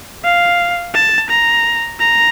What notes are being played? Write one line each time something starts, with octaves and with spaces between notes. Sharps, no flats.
F5
A5
A#5
A#5